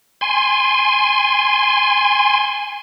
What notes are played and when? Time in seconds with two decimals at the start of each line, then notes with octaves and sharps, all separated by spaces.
0.21 G#5 C6